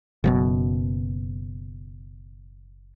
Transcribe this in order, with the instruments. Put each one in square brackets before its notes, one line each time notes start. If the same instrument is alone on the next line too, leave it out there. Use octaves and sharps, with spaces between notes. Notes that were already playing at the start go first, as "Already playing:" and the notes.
[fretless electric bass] F#1 F#2 B2